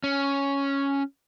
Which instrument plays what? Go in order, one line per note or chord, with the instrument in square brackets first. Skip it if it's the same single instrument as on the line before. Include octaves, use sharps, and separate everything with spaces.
[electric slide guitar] C#4